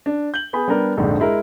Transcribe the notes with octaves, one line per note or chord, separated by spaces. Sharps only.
D4
G6 F#7
B3 G#4 B5
G3 B3 D4 A#4
A#1 F2 G#2 D3
G#3 E4 A#4